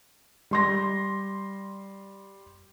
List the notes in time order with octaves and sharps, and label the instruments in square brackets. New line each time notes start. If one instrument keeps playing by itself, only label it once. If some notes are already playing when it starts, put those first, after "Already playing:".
[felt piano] G3 C6 A#6